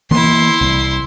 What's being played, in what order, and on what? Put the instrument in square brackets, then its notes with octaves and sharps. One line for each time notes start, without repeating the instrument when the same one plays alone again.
[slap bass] E3 A#3 B3 [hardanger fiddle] E4 C6
[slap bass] C2